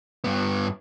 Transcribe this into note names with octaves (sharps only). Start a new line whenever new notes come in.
G2 B3